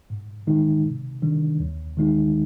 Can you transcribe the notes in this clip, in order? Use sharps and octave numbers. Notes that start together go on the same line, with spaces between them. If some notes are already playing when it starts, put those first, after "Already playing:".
G#2
D#3 G#3 D#4
C3
D#3 G3 D4
D#2
D#3 G#3 D#4